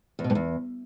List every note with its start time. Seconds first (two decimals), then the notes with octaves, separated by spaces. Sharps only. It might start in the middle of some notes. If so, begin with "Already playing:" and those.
0.19 E2
0.24 B2
0.30 G2
0.35 E2